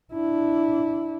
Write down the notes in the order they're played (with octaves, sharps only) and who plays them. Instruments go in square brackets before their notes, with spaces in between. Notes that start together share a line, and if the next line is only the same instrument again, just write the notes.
[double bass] D4 E4